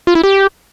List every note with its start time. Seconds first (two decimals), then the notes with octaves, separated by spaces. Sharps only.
0.07 F4
0.15 E4
0.24 G4